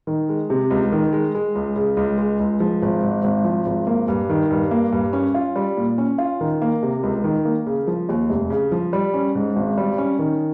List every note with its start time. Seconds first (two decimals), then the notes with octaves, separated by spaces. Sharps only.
0.07 D#3
0.29 G#3
0.50 C3
0.70 C#2
0.92 D#3
1.13 G#3
1.35 G#3
1.55 C#2
1.76 C#3
1.97 C#2
2.18 G#3
2.40 C#2
2.60 F3
2.82 G#1
3.03 G#2
3.24 G#1
3.45 F3
3.66 G#1
3.87 A#3
4.08 G2
4.29 D#3
4.51 G2
4.71 A#3
4.93 G2
5.13 C#4
5.34 F4
5.56 G3
5.77 A#2
5.98 C#4
6.18 F4
6.41 D#3
6.62 A#3
6.82 C3
7.03 C#2
7.24 D#3
7.45 A#3
7.66 C#3
7.87 F3
8.09 D#2
8.30 F1
8.50 C#3
8.72 F3
8.93 G3
9.14 C#4
9.35 G#2
9.56 G#1
9.78 G3
9.98 C#4
10.19 D#3